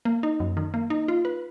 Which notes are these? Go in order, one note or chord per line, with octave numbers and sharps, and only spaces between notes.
A#3
D#4
F#2
D#3
A#3
D#4
F4
B4